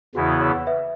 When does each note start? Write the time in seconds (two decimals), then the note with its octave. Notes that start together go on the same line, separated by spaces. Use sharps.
0.15 E2 C#3 E3 B3 E4 F#4
0.41 C#5 F#5
0.67 B4 E5